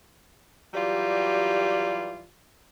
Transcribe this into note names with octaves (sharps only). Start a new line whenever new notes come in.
E3 F#3 G3 F4 G4 D5